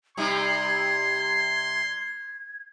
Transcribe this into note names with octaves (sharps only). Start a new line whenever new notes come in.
C3 G3 D#4 C6 G#6